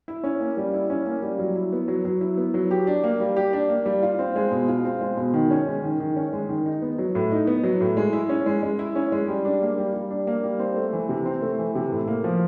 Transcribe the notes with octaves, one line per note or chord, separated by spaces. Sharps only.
E4
C#4
A#3
G3
E4
C#4
A#3
G3
F#3
E4
B3
F#3
F#3
E4
B3
F#3
G4
D4
A#3
G3
G4
D4
A#3
G3
F4
C4
G#3
B2
F4
C4
G#3
B2
D#3
C#4
G#3
D#3
D#3
C#4
G#3
D#3
D#4
B3
F#3
A2
D#4
B3
F#3
A2
G#3
E4
C#4
G#3
G#3
E4
C#4
G#3
G3
D4
A#3
G3
G3
D4
A#3
G3
C4
A3
E3
C3
C4
A3
E3
C3
A2
A#3
F3